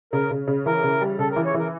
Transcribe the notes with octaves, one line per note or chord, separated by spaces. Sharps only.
C#3 A#4
C#3
C#3
E3 A#4
C#3
G3
C#3 A4
A#4
E3
C#5
E3 A#4